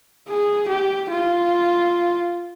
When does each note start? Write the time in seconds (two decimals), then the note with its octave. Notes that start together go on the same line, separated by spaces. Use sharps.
0.28 G#4
0.69 G4
1.10 F4